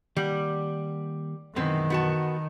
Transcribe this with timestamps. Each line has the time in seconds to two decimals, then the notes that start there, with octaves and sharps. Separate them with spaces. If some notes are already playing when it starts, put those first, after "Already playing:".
0.17 D#3 G3 A#3 F#5
1.56 F#2 B2 D#3 E3 G#3 B3 C4
1.90 B3 F#4 A5